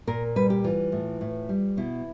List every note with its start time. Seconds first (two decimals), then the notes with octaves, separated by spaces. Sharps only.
0.07 A#2 A#4
0.36 G3 B4
0.50 G4
0.64 E3 F4
0.92 A2
1.21 A2
1.49 G3
1.77 B2 E4